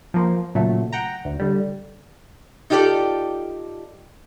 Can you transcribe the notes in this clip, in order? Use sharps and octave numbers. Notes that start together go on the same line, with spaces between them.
F3 A#3 C5
A#2 C#3 F#3 A3
F#5 G5 A#5
D2
D3 G3
D#4 F4 G4 A4 D5